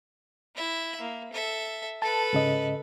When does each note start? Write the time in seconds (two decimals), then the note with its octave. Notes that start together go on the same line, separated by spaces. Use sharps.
0.56 E4 E5
1.01 A#3
1.33 A4 E5
2.02 A4 B4 A5
2.33 G#2 C#3 D#5